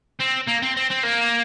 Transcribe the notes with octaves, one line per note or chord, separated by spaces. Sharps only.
C4
A#3
C4
C4
C4
A#3